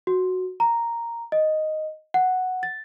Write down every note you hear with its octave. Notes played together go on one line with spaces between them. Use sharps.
F#4
A#5
D#5
F#5
A6